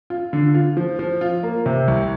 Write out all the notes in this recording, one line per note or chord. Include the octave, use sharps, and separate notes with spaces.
F4
D3
F4
F3
F3
F4
A#3
C3
C2